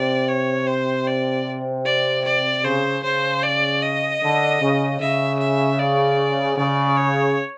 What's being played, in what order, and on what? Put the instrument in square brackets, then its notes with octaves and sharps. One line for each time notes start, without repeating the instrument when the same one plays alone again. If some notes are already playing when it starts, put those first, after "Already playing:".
Already playing: [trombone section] C3 [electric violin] D5
[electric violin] C#5
C5
D5
D5
D5
[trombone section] C#3 [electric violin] C5
[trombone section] C#3 [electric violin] C5
[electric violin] D5
D#5
[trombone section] D3
C#3
[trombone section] C#3 [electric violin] E5
[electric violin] E5
D5
[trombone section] C#3 [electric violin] D5
[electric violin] C#5